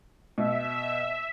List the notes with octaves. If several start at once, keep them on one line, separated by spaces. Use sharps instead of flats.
B2 E5